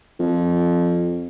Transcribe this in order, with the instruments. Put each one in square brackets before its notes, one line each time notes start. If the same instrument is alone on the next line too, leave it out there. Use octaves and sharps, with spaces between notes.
[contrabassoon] F2